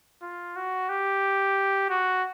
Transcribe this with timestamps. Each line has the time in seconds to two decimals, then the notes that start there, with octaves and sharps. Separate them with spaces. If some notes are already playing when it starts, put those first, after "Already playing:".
0.22 F4
0.56 F#4
0.89 G4
1.90 F#4